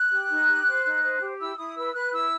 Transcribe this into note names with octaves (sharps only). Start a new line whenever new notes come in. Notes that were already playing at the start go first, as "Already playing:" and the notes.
Already playing: F#6
G4
D#4
G4
C5
D#4
C5
G4
E4 E6
E4 D#6
B4 E6
B4 F#6
E4 E6